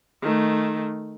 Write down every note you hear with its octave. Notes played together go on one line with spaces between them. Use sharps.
D#3 A3